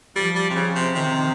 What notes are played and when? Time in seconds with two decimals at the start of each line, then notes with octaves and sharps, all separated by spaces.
0.16 F3 G3
0.36 G3
0.50 C3
0.55 C#3
0.75 C3
0.95 C3 D#3